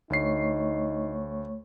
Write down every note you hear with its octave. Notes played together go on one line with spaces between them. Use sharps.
D2 A3 D#4 C#5 C#6 C7